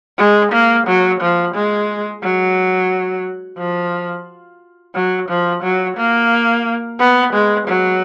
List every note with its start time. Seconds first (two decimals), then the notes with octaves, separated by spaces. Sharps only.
0.18 G#3
0.52 A#3
0.87 F#3
1.21 F3
1.55 G#3
2.23 F#3
3.58 F3
4.95 F#3
5.29 F3
5.63 F#3
5.98 A#3
7.00 B3
7.33 G#3
7.68 F#3